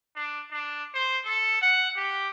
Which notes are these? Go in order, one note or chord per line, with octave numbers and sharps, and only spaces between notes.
D4
D4
C5
A4
F#5
G4